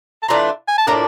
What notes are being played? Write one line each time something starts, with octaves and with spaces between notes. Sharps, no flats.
A5
E3 A3 D4 F4 A#5
G#5
A5
A2 F3 A#3 D4 A#5